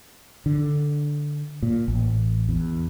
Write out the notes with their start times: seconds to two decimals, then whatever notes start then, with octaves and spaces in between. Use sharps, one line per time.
0.46 D3
1.62 A#2
1.88 A1
2.49 E2